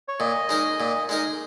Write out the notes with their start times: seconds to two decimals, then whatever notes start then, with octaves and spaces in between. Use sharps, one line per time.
0.08 C#5
0.20 A#2 D#5
0.49 G#3 D#4 A#4
0.80 A#2
1.09 G#3 D#4 A#4